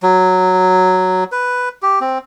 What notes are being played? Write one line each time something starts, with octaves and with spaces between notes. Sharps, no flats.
F#3
B4
G4
C4